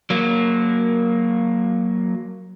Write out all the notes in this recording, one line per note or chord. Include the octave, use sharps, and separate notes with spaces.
F#3 A#3